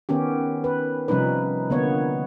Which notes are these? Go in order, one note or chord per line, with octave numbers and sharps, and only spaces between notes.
D#3 B3 C#4 G4
B4
C3 F3 G3 C#4 D#4 B4
D3 A#3 B3 C#5